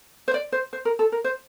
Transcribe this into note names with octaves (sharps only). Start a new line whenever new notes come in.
C5
D5
C5
C5
A#4
A4
A#4
C5